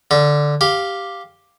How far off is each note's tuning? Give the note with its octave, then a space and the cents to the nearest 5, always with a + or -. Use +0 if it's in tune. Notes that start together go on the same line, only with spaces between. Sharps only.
D3 +0 F5 -45
G4 +0 F5 +0